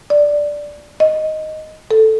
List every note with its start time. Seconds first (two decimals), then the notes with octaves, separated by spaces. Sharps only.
0.10 D5
1.00 D#5
1.91 A4